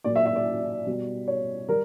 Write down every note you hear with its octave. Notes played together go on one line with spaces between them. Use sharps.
A#2 F#3 D5
E5
E5
D5
B2 G3
C#5
G3 A#4